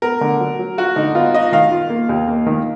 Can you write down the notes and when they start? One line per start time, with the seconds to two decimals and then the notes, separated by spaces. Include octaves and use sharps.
0.02 B3 A#4
0.21 D3
0.40 F#3
0.59 F#3
0.78 F4 F#4
0.96 D3 D#4
1.15 B3 F4
1.34 F4 D#5
1.52 D#3 F5
1.71 F4
1.90 A#3
2.09 D#2
2.28 A#3
2.46 D#3